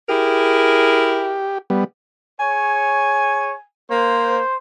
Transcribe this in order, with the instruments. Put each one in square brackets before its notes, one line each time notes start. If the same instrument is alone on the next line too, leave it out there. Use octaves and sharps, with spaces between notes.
[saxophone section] E4 G#4 A#4 [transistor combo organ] G4
[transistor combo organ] G3 B3
[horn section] G#4 C#5 [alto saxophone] G#5
[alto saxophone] A#3 [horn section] C5